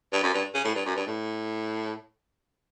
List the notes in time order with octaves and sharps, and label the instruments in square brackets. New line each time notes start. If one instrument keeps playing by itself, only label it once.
[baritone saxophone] G2
F#2
G2
C#3
A2
G2
F#2
G2
A2